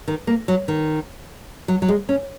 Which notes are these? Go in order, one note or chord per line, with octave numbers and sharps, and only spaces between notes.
D#3
A#3
F#3
D#3
F#3
F#3
G#3
C#4